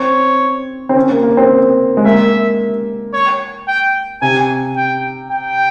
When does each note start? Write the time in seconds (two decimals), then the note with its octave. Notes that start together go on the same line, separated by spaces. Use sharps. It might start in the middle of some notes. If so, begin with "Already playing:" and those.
Already playing: C4 C#5
0.89 C4
0.96 C#4
1.10 A#3
1.23 A#3
1.37 C4
1.97 G#3
2.05 A#3 E5
3.13 C#5
3.68 G5
4.22 C3 G#5
4.76 G5
5.31 G5